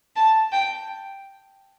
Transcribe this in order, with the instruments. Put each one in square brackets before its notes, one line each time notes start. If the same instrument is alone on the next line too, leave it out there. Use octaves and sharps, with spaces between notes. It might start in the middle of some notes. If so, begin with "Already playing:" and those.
[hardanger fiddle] A5
G5